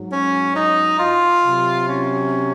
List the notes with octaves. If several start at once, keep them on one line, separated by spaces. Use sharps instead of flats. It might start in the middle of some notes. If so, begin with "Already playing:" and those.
Already playing: G#2 F#3
C#4
D#4
F4
C3 F#3
C#4